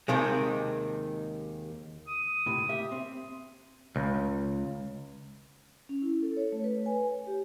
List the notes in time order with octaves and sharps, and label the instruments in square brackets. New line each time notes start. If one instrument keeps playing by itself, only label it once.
[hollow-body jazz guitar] D#2 C3 D#3 G#3
[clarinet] D#6
[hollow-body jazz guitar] A2 C3
G4 E5
C4
[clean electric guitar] C#2
[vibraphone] C#4
E4
A4
C#5
A3
B4
G#5
C#5
G4